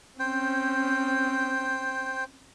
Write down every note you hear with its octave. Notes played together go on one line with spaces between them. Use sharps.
C4 C#4 C5 G5